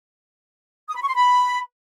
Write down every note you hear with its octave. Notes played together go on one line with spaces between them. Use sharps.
D#6
B5
C#6
C6
B5